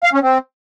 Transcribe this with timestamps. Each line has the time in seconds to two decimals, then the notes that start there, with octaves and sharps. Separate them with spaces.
0.04 F5
0.13 C#4
0.23 C4